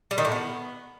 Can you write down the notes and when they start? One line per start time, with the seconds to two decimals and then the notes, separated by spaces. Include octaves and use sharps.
0.11 G3
0.18 D#3
0.25 A2
0.32 B3